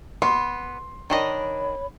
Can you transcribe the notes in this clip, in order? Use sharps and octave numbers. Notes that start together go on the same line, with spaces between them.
B3 C6
D#3 D4 C#5 D#5 B5